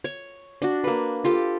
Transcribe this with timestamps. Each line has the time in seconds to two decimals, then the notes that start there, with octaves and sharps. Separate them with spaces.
0.04 C#5
0.62 D4 F#4
0.84 A#3 B4
1.24 F4 G4 A4